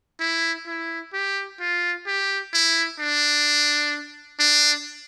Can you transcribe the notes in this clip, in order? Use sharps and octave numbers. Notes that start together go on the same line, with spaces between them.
E4
E4
G4
F4
G4
E4
D4
D4